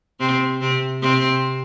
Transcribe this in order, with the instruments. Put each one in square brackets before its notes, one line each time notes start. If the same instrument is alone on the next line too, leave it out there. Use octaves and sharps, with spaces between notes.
[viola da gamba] C3 C4
C3 C4
C3 C4